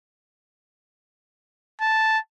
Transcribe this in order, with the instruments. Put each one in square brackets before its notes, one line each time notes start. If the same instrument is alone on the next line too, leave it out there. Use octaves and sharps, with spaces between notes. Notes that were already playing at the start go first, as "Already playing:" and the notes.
[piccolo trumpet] A5